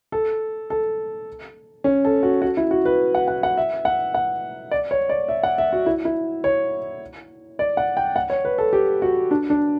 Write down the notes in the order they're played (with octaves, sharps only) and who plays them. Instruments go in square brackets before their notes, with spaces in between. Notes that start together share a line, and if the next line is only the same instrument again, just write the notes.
[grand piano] A4
A4
C#4
A4
F#4
F#4
E4
F#4
B4
F#5
F#5
F#5
E5
F#5
F#5
D5
C#5
D5
E5
F#5
E5
F#4
E4
E4
C#5
D5
F#5
G5
F#5
C#5
B4
A4
G4
F#4
D4
D4